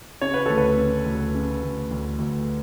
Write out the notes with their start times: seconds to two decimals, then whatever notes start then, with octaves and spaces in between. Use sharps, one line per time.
0.21 C#3 C#5
0.34 B4
0.46 D2 A4
0.58 B4
0.77 C#3
1.06 D2
1.35 C#3
1.63 D2
1.91 D2
2.19 D2